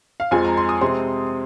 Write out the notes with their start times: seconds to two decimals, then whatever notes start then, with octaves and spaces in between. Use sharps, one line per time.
0.20 F5
0.31 F2 F3 G#3 G#5
0.45 A#5
0.57 C6
0.69 D#6
0.81 C3 G#3 C4 C6